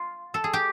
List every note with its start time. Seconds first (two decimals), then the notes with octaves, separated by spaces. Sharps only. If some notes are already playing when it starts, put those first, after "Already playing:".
Already playing: F4
0.34 A4
0.44 G#4
0.53 G4